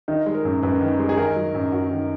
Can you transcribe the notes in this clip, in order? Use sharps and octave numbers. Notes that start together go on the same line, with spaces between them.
D#3 D#4
G#3
A#4
F#2
F#2 B4
D#3
G#3
G#4
D#3 A#4
F#3
F#2
F#2 F#4
D#3